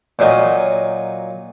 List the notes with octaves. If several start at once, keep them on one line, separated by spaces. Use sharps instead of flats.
A#2 F#3 D#4